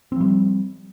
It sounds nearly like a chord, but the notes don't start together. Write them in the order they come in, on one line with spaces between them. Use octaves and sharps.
C4 F3 G3